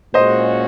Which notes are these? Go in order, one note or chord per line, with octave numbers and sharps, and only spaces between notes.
A#2 G#3 C#4 F#4 C5 D#5